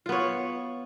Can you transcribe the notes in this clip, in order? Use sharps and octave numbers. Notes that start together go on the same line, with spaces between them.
B3 F4 C#5